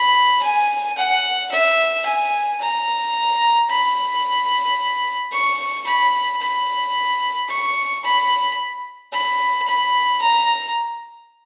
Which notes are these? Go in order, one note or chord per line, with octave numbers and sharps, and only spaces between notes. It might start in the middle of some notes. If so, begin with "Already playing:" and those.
Already playing: B5
G#5
F#5
E5
G#5
A#5
B5
C#6
B5
B5
C#6
B5
B5
B5
A#5